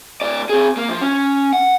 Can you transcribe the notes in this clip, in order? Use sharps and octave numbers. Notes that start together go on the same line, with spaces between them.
A2 D5
C4 G#4
A#3
F3
C#4
F#5